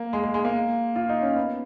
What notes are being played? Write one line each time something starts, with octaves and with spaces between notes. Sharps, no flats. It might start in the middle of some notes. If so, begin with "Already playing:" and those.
Already playing: A#3
G#3
G#3
G#3
A#3
F4
D#4
C#4
B3